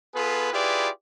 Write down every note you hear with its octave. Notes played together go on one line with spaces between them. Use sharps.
B3 F4 G#4 A4 B4
E4 F4 G4 G#4 B4 D5